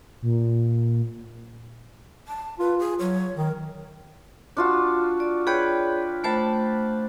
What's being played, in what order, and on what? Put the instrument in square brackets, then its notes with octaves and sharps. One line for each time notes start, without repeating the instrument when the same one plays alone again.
[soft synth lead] A#2
[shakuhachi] A5
[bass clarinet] F4 [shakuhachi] B4
[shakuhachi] G#4
[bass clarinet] F#3 [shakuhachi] C#5
[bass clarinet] D#3 [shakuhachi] A#4
[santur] D4 F4 F#4
[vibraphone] D5
[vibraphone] G#4 C#5 D5 [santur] B4 G5
[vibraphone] A3 C5 [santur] G5 A5 B5